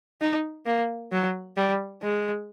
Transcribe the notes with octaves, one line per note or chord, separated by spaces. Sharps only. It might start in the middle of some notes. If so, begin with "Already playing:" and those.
D#4
A#3
F#3
G3
G#3